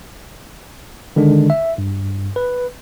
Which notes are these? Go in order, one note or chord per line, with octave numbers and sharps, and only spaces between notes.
D3 D#3 G#3 D4
E5
G2
B4